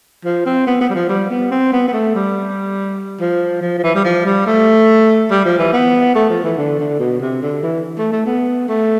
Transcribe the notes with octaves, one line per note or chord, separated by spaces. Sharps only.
F3
C4
B3
B3
G3
F3
G3
B3
C4
B3
B3
A3
G3
F3
F3
F3
E3
G3
F3
G3
A3
G3
F3
E3
B3
A3
F3
E3
D3
D3
B2
C3
D3
E3
A3
A3
B3
A3